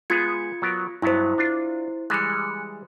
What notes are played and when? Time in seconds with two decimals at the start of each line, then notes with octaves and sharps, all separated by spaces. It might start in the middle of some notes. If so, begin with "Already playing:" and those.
0.10 G#3 B3 F4 G#4 G#6 C#7
0.62 F#3 B3 A#4
1.02 G2 F#3 B3 E4 C5
1.38 D4 F4
2.10 E3 G3 G#3 F#6 C#7